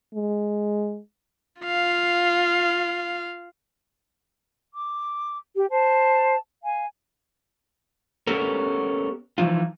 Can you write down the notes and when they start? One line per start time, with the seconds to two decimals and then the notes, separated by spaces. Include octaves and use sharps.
0.14 G#3
1.62 F4 F5
4.74 D6
5.55 G4
5.71 C5 A5
6.64 F5 G#5
8.27 B3 C#4 G4 A4 A#4
9.38 E3 F3 D#4 F4